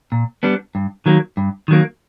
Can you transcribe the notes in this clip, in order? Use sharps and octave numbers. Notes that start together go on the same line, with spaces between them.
A#2
G3 B3 D4
G2
D#3 F#3 A#3
G2
D#3 F#3 A#3